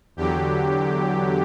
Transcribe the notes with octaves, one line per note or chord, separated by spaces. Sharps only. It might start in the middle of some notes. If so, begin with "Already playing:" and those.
E2 D3 F#3 G4